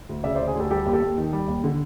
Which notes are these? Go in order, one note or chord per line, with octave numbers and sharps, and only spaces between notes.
D2
C#3 D5 E5
D2 C5 D5
G#4
D2 G4 A4
G3 G4 A4
D#2
G4 A4
D#2
D#3
G3
D#2
D3